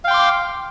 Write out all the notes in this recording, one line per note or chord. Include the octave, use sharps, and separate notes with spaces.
F5 G5 C6 D6